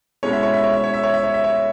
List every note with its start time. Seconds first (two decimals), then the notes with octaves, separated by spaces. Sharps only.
0.23 B2 G#3 C#4 E4 C#5
0.33 E5
0.43 C#5
0.53 E5
0.64 C#5
0.73 E5
0.84 C#5
0.94 E5
1.03 C#5
1.14 E5
1.24 C#5
1.34 E5
1.44 C#5